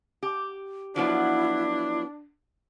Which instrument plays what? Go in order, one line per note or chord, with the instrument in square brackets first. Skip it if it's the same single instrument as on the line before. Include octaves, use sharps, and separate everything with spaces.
[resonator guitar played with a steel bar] G4
[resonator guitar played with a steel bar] F3 F#3 B3 [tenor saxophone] D4 [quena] E4